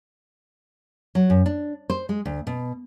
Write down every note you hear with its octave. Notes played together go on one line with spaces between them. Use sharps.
F#3
F#2
D4
C5
G#3
D2
B2